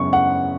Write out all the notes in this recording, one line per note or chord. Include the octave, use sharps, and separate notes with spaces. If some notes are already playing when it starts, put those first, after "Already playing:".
Already playing: F#2 C#3 B3 C#6
F#5